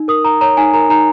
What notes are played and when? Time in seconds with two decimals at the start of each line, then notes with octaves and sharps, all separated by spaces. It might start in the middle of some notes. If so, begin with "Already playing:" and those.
Already playing: D#4
0.08 A#4 D#6
0.24 D#4 A#5
0.41 C#5 A#5
0.57 D#4 G#5
0.74 A#4 A#5
0.90 D#4 A#5